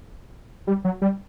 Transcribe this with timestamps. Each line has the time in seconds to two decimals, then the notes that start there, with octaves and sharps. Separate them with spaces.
0.67 G3
0.85 F#3
1.02 G3